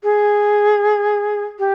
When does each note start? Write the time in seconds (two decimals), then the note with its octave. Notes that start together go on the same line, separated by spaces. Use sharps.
0.03 G#4
1.59 G4